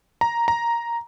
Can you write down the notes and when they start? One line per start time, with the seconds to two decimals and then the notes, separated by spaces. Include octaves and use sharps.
0.21 A#5
0.48 A#5